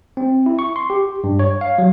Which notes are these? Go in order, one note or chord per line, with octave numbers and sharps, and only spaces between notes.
C4
E4
C#6
C6
G4
G2
C#5
F5
F#3